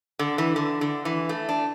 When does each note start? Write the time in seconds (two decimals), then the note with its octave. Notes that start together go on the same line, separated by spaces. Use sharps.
0.19 D3
0.38 E3
0.56 D3
0.81 D3
1.05 E3
1.29 A3
1.49 D4